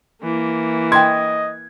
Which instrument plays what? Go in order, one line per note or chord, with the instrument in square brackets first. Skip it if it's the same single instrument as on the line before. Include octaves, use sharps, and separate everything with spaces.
[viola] E3 A#3
[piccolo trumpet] D#5 [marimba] G5 C6 [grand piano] G#6